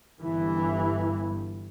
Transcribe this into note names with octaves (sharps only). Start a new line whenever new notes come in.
G1 G2 E3